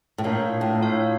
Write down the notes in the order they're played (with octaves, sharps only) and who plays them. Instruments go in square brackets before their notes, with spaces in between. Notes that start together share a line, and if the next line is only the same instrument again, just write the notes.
[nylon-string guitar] A2
[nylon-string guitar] A#2 [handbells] A3 D4 F4 C#5 F5
[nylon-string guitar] A2
[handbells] A3 D4 F4 C#5 F5